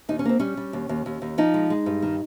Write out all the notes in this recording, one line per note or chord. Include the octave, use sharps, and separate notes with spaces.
D#2 D#4
C#4
A#3 C4
G3 C#4
G3
D#2
D#2
D#2
D#2
F3 D#4
G#3
G#3
G2
D#3